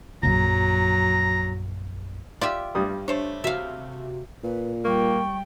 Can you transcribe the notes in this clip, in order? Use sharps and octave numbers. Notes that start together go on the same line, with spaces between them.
A#1 F#2 F#3 A#5
F4 G4 D5 E5
G2 G3 D#6
A3 D4 C5 C#5
C3 F#4 E5 F5
A#2 B4
G3 A#3 G5 C#6